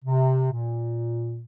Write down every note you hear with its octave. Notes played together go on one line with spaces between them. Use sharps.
C3
A#2